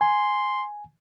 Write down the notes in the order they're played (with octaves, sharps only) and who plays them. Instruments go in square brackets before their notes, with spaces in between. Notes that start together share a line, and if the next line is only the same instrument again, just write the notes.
[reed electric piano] G#5 [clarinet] C6